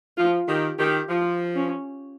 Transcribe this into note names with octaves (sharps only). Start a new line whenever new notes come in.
F3 F4
D#3 G4
D#3 G4
F3 F4
C#4